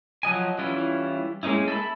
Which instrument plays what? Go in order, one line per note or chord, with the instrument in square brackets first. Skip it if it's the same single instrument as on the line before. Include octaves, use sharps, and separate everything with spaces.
[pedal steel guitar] F3 F#3 D#5 G#5
E3 G3 C#4 E4 F4
G#3 A#3 C#4 D#4 E4
A4 E5 B5